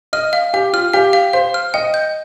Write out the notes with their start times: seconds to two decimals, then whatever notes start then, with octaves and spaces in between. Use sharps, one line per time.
0.13 D#5 F6
0.33 F5
0.54 G4 F5
0.73 F4 F6
0.94 G4 F5
1.13 F5
1.33 C5 F5
1.54 F6
1.74 D#5 G5
1.94 G6